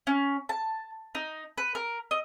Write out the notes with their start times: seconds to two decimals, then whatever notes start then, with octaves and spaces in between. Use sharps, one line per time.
0.07 C#4
0.49 A5
1.15 D#4
1.58 B4
1.75 A#4
2.11 D#5